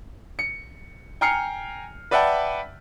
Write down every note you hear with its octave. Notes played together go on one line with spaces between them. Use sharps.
C#7
G5 G#5 A#5 F6 C7 C#7
B4 D5 E5 F#5 G5 A5